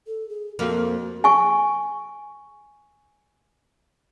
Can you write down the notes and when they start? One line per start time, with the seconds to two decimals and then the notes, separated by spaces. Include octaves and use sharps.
0.07 A4
0.29 G#4
0.59 F2 A#3 F#4
1.24 G#5 C#6